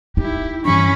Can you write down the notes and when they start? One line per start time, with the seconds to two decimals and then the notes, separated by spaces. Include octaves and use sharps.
0.17 D#4 E4 G4
0.65 G2 E3 C#4 D4 B5 C#6